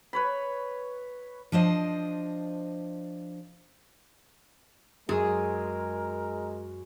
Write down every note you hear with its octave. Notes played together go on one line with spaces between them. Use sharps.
B4 C#5 B5
F3 D4 C5 D#5
F#2 G#3 G#4 A#4 C6 E6